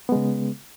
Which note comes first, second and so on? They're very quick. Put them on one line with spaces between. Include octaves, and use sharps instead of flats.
B3 G#3 C#3